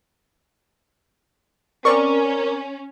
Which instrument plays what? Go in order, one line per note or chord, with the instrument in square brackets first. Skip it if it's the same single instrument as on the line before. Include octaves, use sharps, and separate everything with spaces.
[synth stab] C4 D5 C#6 [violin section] C#4 [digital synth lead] A#4